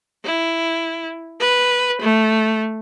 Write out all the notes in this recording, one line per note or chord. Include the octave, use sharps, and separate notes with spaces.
E4
B4
A3